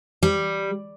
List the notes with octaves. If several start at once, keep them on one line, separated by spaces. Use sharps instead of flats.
G3